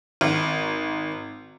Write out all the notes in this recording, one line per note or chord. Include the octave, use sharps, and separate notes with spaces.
G#1